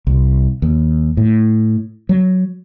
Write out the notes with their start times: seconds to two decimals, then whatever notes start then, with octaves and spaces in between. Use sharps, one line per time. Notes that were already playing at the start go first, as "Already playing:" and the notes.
0.07 C2
0.62 D#2
1.17 A2
2.09 F#3